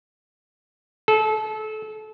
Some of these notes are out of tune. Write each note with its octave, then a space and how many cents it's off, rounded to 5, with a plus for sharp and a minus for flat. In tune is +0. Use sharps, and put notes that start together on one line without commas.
A4 -30